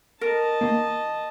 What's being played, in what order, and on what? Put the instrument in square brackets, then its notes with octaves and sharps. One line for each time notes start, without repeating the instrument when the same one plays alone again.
[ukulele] A#4 [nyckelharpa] D#5 A5
[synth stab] D#3 A#3